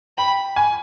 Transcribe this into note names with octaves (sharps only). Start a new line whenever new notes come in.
G5 B5
G#5